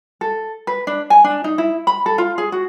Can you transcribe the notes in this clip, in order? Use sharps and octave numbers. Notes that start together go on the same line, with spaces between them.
A4
B4
D4
G#5
D4
D#4
E4
B5
A4
F4
G#4
F#4